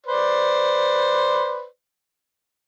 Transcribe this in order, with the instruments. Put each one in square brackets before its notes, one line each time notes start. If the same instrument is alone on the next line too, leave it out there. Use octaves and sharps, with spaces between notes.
[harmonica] B4 C5 D5